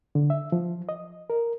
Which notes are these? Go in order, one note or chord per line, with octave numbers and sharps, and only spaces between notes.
D3
E5
F3
D#5
A#4